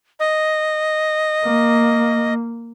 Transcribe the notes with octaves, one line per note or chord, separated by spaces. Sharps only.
D#5
A#3